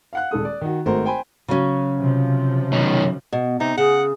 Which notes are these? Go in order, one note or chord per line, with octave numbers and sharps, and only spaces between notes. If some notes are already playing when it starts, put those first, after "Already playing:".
F5 F#5 F#6
D#1 G#3 A4 D#6
D5
D#3 F#4
G#1 A3 F#4 A#4 C5
C5 G5 G#5 B5
C#3 F#3 C#4
C3 F3
F#2 D#3
B2
C3 D#4
C#3 G#4 F#5